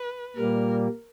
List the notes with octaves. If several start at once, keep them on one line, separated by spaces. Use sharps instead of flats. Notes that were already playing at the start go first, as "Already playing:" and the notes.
Already playing: B4
A#2 G3 A#3 A#4